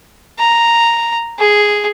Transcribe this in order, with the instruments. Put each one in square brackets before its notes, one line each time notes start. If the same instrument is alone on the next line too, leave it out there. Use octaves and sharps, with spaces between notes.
[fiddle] A#5
G#4